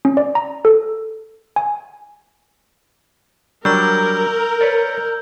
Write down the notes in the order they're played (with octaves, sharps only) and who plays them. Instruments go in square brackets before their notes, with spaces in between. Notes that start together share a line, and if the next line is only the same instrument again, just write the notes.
[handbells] C#4
D5
A#5
A4
G#5
[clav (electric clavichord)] F#3 G3 D4 [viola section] A#4 [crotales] E6 G6
[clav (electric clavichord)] B4 C#5 D5